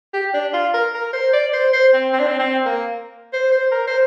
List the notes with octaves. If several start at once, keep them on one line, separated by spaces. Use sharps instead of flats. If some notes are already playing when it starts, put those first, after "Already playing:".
G4
D4
F4
A#4
A#4
C5
D5
C5
C5
C4
C4
D4
C4
C4
A#3
C5
C5
A#4
C5